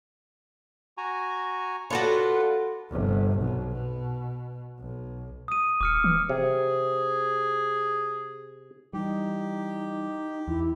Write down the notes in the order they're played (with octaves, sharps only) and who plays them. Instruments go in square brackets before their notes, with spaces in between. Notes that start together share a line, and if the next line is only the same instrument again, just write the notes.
[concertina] F#4 G#5 A#5
[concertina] D4 F4 B4 [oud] F#4 A4 C#5
[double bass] G1 C3
B1
B2
B1
[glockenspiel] D#6 D#7
[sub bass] D#1 [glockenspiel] D6 F6 C#7
[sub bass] E3
[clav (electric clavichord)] C3 [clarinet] G#4
[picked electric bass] E3 G3 [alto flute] D#4 [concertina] G4
[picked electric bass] E2 [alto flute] E4